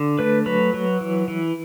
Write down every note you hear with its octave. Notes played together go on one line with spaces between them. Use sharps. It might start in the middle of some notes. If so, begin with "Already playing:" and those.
Already playing: D3
A3 B4
F#3 B4
F#3
E3
E3